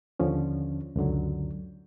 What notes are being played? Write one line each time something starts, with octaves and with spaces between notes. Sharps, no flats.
D#2 D3 F3 C#4
C#2 F#2 D3 F#3